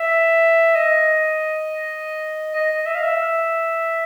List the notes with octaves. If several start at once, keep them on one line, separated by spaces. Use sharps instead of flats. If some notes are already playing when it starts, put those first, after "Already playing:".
Already playing: E5
D#5
D#5
E5
F5
E5